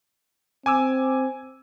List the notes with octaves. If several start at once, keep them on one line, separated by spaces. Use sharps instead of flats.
C4 G#5 D6 E6